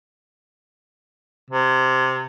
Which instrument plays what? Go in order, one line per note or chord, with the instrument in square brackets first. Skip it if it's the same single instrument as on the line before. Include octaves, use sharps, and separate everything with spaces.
[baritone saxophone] C3